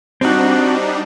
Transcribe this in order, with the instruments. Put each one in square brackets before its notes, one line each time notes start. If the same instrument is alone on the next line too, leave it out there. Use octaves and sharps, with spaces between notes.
[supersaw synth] G3 D4 D#4 [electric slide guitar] C4 F#4